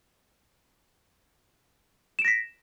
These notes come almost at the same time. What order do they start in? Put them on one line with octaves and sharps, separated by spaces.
E7 D7 A#6 B6